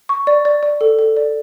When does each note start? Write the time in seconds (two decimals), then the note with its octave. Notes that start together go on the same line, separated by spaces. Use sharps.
0.09 C#6
0.27 D5
0.45 D5
0.63 D5
0.81 A4
0.99 A4
1.17 D5